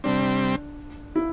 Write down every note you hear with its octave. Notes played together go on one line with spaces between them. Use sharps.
C3 G3 C4 D4
E4